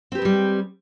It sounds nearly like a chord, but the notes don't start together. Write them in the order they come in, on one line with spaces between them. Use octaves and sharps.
C4 G4 B4 G#3 G3